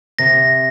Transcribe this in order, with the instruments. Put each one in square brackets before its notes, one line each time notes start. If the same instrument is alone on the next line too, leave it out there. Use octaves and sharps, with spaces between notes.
[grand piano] C3 [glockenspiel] A#6